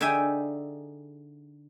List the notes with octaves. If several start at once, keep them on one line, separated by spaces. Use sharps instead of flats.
D3 D#4 G#4 E5 G5 G#5